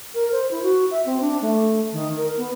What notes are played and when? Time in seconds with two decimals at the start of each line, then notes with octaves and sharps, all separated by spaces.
0.15 A#4
0.32 C5
0.51 E4
0.63 F#4
0.91 E5
1.06 C4
1.21 D4
1.42 A3
1.93 D#3
2.16 A#4
2.37 B3